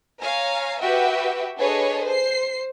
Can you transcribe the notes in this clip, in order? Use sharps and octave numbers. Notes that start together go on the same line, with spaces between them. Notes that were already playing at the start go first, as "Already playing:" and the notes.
C#5 F5 G#5 A#5
F#4 G4 B4 E5 F#5 G5
D4 G#4 A4 B4 C#5 D#5
C5 C7